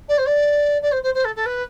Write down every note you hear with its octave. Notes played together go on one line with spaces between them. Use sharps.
D5
C5
D5
D5
C5
C5
C5
A4
A4
B4